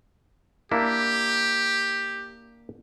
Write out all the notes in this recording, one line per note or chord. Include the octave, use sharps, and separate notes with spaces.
A#3 D4 E4 G4